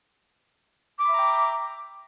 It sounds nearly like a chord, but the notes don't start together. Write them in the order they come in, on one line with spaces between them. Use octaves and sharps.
D6 B5 E5 A#5 G5